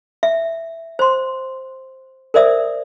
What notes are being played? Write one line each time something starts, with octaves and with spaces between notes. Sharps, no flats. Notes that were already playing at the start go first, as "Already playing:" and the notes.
E5
C5 C6
A#4 C5 D5 E5 D#6